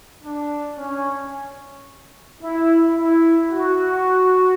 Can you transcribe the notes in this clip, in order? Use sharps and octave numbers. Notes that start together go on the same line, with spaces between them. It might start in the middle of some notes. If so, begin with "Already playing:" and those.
D4
C#4
E4
E4
F#4